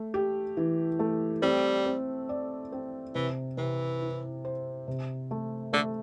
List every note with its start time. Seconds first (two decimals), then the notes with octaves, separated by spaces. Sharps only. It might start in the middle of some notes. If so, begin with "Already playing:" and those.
Already playing: A3
0.14 G4
0.57 E3
0.99 A3
1.42 G3 C4
1.86 C4
2.29 D5
2.72 C4
3.15 C3 E3
3.57 C3 E3
4.02 E4
4.45 C5
4.88 C3
5.31 A3
5.73 D3 A3